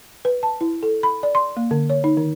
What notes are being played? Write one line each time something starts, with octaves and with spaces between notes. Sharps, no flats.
B4
A5
E4
A4
B5
D5
C6
A#3
D3
C#5
D#4
D#3